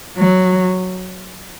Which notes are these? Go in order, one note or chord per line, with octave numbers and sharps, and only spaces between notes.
F#3